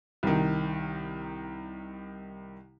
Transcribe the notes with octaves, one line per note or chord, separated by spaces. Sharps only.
C2 D#3